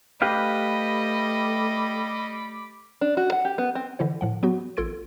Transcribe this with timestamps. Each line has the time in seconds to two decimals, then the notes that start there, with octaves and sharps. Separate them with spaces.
0.22 G3 A3 G4 B4 D#5 F5 B5 D6
3.01 D4
3.17 F#4
3.32 F#5
3.45 G4
3.58 B3
3.75 C4
3.99 D3 E3 E4 C5
4.21 A2 F3 F#5
4.43 F#3 B3 F#4
4.77 A1 F4 A4 C6 G#6 D7